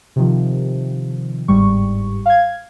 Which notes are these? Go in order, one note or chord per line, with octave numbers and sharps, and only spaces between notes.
C3 D#3 F3
G1 G#2 G3 C#6
F5 G#6